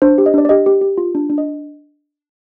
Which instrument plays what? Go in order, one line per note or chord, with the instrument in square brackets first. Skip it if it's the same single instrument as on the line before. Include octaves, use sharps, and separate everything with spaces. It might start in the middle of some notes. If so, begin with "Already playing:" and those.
[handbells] D4 C5
G4
D#5
D4 D5
D5
G4 D#5
G4
G4
F4
D4
D4
D#5